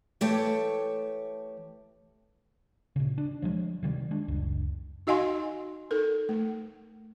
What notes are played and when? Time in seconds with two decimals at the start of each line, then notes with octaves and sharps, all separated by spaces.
0.21 E3 A3 G4 C#5 G5 A5
2.96 A#2 C#3
3.18 D4
3.42 F3 F#3 G#3
3.83 C3 D#3 G3
4.11 G#3 D4
4.28 F#1 C#2
5.07 D#4 F#4 D#5 F5 G#5 C6
5.91 D#4 A4 A#4
6.29 A3